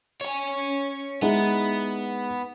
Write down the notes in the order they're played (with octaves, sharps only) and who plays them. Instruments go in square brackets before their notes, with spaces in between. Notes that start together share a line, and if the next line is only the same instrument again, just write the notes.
[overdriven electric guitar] C#5 G#5
[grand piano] G#3 D#4 E4 [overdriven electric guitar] B3